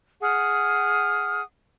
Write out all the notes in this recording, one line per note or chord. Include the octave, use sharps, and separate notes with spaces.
G#4 F#5 D#6 F6